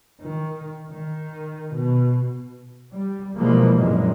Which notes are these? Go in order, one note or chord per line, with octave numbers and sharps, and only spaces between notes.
D#3
D#3
B2
G3
B2 E3 F3 G3 G#3 A#3
F#2 A#2 D3 G#3 C4